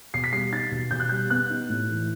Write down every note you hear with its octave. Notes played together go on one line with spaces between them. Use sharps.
B2 C7
B6
G3 C7
D#4 A6
B2
B2 G6
F#6
G3 G6
B3 F#6
D#4
A2
E3